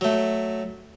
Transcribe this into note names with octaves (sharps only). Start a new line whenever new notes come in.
F#3 A3